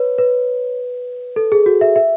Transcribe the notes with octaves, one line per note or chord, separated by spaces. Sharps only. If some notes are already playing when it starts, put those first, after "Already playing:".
Already playing: B4 C#5
B4
A4
G#4
F#4
E5
E5